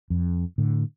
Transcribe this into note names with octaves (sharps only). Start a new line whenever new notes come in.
F2
A2 D3